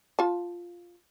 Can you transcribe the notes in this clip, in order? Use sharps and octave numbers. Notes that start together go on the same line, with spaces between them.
F4 A5